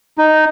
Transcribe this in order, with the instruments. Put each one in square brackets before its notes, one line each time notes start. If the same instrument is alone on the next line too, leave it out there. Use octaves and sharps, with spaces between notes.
[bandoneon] D#4